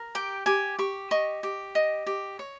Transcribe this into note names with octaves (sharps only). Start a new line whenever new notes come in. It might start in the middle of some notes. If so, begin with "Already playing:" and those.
Already playing: A#4
G4 G5
G4 G#5
G4 C#6
D#5 C#6
G4
D#5
G4
C#5